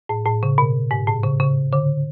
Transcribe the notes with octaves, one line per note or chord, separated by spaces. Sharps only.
A2
A2
C#3
B2
G#2
A2
C#3
C#3
D3